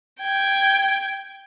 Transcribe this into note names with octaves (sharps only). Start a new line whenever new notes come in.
G5 G#6